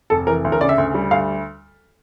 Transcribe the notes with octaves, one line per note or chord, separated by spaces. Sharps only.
F1 A4
E3 A#4
D2
A#4
C#3 D5
E5
D2
G3
D2 F5